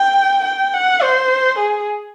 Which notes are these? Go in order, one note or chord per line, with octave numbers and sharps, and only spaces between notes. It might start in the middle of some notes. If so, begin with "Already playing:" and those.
Already playing: G5
G5
F#5
C5
G#4